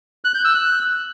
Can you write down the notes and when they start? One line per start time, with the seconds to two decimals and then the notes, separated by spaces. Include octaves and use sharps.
0.25 F#6
0.35 G6
0.45 E6
0.55 F#6